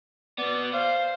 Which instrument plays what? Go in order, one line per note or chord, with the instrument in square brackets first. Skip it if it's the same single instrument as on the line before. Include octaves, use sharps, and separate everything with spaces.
[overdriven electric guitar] B2 B3 [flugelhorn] D5
[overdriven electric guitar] C5 [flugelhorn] F5